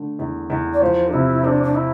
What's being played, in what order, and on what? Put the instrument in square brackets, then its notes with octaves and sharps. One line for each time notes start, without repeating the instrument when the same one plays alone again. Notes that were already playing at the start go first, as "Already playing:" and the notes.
Already playing: [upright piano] D3 A3
E2
E2
[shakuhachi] D5
[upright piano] F3 [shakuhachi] C5
[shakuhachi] D4
[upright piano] C3 [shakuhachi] E4
[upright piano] C4 [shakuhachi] D4
[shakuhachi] D4
E4